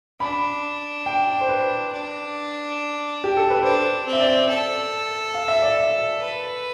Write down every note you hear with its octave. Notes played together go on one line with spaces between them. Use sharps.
D4 B5
G5
C5
B4
D4
G4
A4
B4
D4 C5
C4
E5
D5
A4
F5
E5
D5
E5
B4